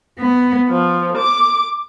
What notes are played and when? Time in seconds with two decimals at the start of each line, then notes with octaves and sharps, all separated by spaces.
0.19 B3
0.68 F3
1.16 D6